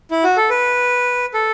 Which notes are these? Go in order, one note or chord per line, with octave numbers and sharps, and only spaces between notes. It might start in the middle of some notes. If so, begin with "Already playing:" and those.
E4
F#4
A4
B4
A4